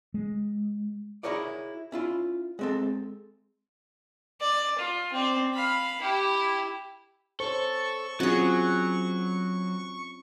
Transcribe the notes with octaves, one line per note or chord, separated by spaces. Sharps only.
G#3
E4 F#4 G#4 A#4 C#5 D5
C#4 E4 F4
G#3 C4 A4
D5
F4
C4 D5
F5 B5
E4 G4
A4 C5 C#5 C#6
F#3 C4 C#4 F4 F#4 G#4